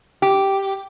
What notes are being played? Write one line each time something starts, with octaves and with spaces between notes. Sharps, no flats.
G4